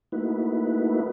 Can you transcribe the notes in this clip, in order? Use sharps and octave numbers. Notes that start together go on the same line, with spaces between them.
A3 A#3 D#4 E4 F#4 B4